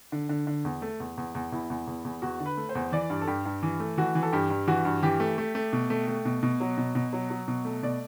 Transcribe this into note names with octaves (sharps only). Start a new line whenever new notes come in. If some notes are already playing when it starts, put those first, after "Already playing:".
D3
D3
D3
E2
A3
E2
E2
E2
E2 E4
E2
E2
E2
E2 F#4
D3
B4
A3
C5
E2
E3 D5
G2
A4
G2 G4
G2
E3
A3
E3 F#4
E3
A4
G2 G4
G2
E3 F#4
G2
E3 G4
A3
A3
A3
B2
A3
A3
B2
B2
F#3
B2
B2
F#3
F#3
B2
A3
B2 D5